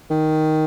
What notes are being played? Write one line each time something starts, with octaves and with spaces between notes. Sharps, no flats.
D#3